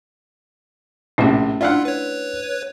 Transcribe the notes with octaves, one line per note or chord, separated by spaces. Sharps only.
A#1 A2 C3 A3 C#4
D4 E4 F4 D5 F5 F#5
B4 C#5